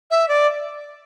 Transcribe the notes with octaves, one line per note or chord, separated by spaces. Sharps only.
E5
D5